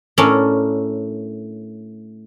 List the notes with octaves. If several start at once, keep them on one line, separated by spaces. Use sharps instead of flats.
A2 C#4 D4 A4 A#4